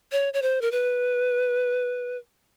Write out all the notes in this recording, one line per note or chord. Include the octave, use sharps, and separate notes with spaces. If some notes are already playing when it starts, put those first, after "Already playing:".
C#5
C#5
C5
A#4
B4